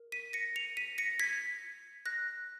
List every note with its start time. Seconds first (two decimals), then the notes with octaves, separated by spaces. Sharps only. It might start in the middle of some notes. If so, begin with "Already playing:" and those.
Already playing: A#4
0.12 B6 D#7
0.33 A#6 C#7
0.56 C#7 F7
0.77 B6 D#7
0.98 A#6 C#7
1.20 G#6 B6
2.06 F#6 A#6